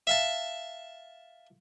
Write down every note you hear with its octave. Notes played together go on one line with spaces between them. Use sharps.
E5 F5 A5